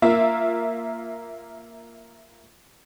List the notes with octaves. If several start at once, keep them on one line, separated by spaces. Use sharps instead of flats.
A#3 F4 E5